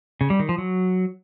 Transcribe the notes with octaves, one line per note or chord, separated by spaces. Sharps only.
C#3
G3
D#3
F3
F#3